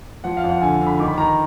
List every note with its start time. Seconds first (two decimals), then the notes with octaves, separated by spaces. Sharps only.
0.24 F3 F#5
0.37 F5
0.44 F2
0.49 F#5
0.61 D3 G#5
0.81 D3
0.87 B5
0.99 D#3 D6
1.08 B5
1.18 D#3 A#5
1.28 A#5